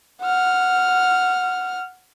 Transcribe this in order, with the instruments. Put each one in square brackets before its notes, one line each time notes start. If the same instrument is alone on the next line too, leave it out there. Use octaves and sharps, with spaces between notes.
[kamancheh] F#5 F6